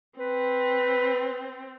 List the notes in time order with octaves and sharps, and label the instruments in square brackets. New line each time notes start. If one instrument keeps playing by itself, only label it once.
[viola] C4 [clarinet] B4